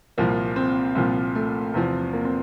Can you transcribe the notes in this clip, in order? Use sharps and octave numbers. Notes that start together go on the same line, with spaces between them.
C2 A#2 F3 A#3
C4
C2 A#2 F3 C4
A3
E2 C3 F3
A#3
C4